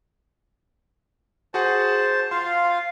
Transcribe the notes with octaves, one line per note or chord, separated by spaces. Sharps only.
F#4 G#4 C5 F#5 A5
F4 F5 C6